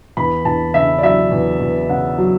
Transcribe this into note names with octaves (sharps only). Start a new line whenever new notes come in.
E2 B5
E2 A5
C#3 E5
D5
F#3 E5
E2
E2
C#3 F#5
F#3